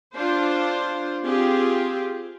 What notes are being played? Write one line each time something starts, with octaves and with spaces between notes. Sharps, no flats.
D4 F4 C5
C4 F4 G4 G#4